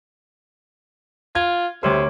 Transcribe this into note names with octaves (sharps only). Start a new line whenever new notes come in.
F4 G#6
D2 C3 A#4 C#5 C6 D6